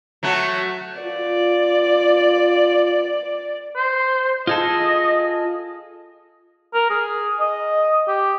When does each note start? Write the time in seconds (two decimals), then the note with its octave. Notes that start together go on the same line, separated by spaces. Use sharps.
0.23 F#3 A3 F#4
1.02 F4 D5
3.75 C5
4.47 F4 G#4 A4 D#5
6.74 A#4
6.90 G#4
7.40 D#5
8.08 G4